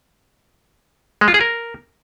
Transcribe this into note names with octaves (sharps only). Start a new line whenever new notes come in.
G#3
F4
G#4
A#4